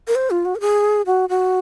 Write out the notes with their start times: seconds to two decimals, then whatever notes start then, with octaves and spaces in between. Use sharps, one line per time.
0.07 A#4
0.15 C5
0.30 F4
0.45 F#4
0.55 A#4
0.61 G#4
1.06 F#4
1.29 F#4